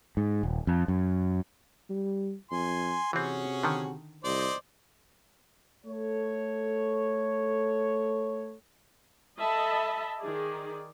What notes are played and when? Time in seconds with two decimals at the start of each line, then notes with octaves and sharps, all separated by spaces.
0.17 G#2
0.43 D#1
0.67 F2
0.88 F#2
1.90 G3
2.51 F2 G#5 C6
3.13 C3 E3 C4 C#4 F#4 G#4
3.63 D3 D#3
4.24 C2 C5 D5 D#5
5.86 A3 A4 C#5
9.39 A4 D#5 E5 A5 B5
10.19 D#3 G#4 D5